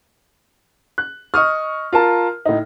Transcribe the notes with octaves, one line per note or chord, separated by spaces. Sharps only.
F#6
D#5 C#6 D#6 F6
F4 A#4 A5
A2 D#4